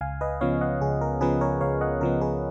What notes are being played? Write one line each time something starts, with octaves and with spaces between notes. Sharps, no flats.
C#2 F5 G#5
B4 D#5
C#3 F3 B3 C#5 F5
D#5 F#5
C#2 G#4
A#4
C#3 F3 B3 G#4 B4
A#4 C#5
C#2 C#5 F5
D#5 F#5
C#3 F3 B3 A#4
G#4 B4